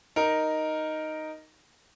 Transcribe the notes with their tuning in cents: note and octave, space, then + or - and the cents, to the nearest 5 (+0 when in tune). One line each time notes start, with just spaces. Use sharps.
D#4 +0 A#4 +0